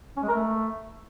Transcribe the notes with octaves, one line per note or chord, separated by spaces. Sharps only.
C#4
G#3
A#4
A3